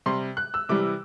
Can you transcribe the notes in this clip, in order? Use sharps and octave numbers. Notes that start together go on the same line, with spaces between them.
C3 G3 C6
F#6
E6
C3 E3 G3 D6